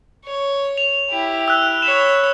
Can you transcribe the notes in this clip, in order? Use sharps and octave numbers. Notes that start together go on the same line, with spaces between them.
C#5
F7
E4 G4
E6 F#6
C#5 B5 E7